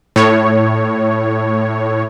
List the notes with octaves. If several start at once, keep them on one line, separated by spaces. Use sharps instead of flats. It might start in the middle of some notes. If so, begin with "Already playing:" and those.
A2 C#5